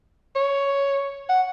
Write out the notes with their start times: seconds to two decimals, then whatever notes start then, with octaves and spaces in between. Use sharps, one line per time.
0.36 C#5
1.29 F#5